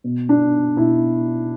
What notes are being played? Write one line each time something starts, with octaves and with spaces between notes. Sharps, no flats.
B2
D4
B2 E4